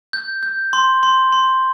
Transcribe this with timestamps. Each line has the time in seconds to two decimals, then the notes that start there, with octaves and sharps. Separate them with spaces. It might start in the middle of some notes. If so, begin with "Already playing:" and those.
0.13 G6
0.43 G6
0.73 C6
1.03 C6
1.32 C6